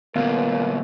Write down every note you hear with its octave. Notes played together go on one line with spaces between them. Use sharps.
D2 A#2 B3 A#4 F5